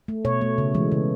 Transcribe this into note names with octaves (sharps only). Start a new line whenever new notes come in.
A3
B2 C#5
A3
C#3
E3 G#3
C#3